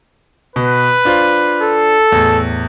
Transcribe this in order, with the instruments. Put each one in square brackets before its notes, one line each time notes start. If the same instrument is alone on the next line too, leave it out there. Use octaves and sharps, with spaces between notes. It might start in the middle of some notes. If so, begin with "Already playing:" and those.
[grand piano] B2 [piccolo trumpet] B4
[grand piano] D4 F4 C5
[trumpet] A4
[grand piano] E2 A2